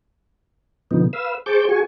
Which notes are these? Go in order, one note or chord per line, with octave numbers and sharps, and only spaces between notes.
B2 D3 F3 B3 D#4
B4 F5 E6
G#4 C5 A5 C#6 D6 G6
F#4 G#4 G#5 C#6